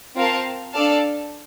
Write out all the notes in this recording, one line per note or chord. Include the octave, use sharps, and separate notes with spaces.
C4 F4 A#4 F5 A5
D4 A4 D5 F5 A5